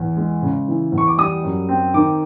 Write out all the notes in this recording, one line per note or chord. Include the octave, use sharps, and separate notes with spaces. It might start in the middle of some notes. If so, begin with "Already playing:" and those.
Already playing: E2
G#3
C#3
E3
E2
C#6
D6
G3 D#6
F#2
C4
D#3 D6